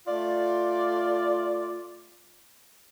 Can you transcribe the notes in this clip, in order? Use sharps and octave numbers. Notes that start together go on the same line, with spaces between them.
A3 F4 D5